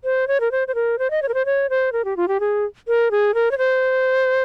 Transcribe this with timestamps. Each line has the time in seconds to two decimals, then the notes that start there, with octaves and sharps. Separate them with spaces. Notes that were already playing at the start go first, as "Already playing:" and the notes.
0.04 C5
0.28 C#5
0.40 A#4
0.52 C5
0.68 C5
0.75 A#4
0.99 C5
1.11 D#5
1.22 C#5
1.28 A#4
1.34 C5
1.46 C#5
1.70 C5
1.92 A#4
2.05 G4
2.17 F4
2.28 G4
2.40 G#4
2.88 A#4
3.11 G#4
3.35 A#4
3.51 C#5
3.58 C5